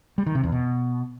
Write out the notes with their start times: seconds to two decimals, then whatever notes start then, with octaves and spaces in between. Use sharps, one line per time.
0.18 G3
0.26 D#3
0.35 C3
0.44 E2
0.52 B2